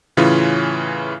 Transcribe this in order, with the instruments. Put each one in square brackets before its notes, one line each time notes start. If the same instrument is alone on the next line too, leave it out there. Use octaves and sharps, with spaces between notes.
[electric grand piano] A2 C#3 E3 C#4 F4